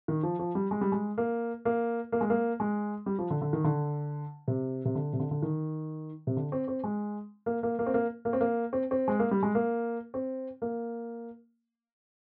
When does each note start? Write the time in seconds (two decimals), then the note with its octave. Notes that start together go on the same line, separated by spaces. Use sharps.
0.08 D#3
0.23 F3
0.39 F3
0.55 G3
0.71 G#3
0.81 G3
0.92 G#3
1.18 A#3
1.65 A#3
2.12 A#3
2.21 G#3
2.30 A#3
2.60 G#3
3.06 G3
3.19 F3
3.30 D3
3.41 D3
3.53 D#3
3.64 D3
4.48 C3
4.85 C3
4.95 D3
5.13 C3
5.19 D3
5.31 D3
5.42 D#3
6.27 C3
6.37 D3
6.52 C4
6.68 C4
6.84 G#3
7.46 A#3
7.63 A#3
7.79 A#3
7.86 C4
7.94 A#3
8.25 A#3
8.33 C4
8.41 A#3
8.73 C4
8.91 C4
9.08 G#3
9.19 A#3
9.31 G3
9.43 G#3
9.55 A#3
10.14 C4
10.62 A#3